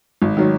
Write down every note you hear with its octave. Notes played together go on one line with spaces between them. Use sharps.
G#1
D#3 F#3